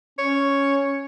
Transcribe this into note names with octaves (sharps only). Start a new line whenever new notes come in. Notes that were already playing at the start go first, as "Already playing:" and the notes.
C#4 C#5